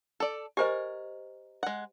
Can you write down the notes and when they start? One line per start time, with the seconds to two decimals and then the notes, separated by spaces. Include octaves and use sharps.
0.20 A4 D5
0.57 G4 A#4 C5 D#5 G#5
1.63 G#3 F#5